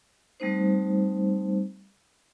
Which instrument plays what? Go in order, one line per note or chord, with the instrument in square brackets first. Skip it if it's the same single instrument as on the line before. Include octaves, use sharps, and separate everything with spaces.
[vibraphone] G3 A3 C4 D#4 C5